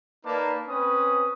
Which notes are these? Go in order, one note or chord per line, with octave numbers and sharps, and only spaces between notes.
A#3 D#4 B4 D5 A5
C4 C#4 B4 D#6